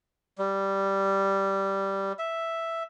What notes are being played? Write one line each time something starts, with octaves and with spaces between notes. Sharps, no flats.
G3
E5